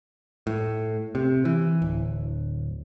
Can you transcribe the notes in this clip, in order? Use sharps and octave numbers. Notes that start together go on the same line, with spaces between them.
A2
C3
E3
D1